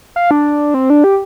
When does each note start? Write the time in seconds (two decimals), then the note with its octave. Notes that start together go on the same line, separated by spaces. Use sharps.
0.16 F5
0.31 D4
0.74 C4
0.90 D4
1.04 G4